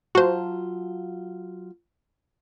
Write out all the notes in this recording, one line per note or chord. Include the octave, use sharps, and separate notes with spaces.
F#3 F4 F#4 C5 A5